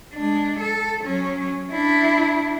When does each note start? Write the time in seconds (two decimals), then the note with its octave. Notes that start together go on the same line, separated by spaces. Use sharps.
0.14 G#3 D4
0.60 A4
1.04 F#3 C#4
1.71 D4 E4